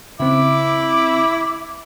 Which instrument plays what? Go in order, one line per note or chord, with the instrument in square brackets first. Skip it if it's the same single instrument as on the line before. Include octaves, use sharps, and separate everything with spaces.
[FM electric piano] C#3 C4 [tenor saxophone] E4 [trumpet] D6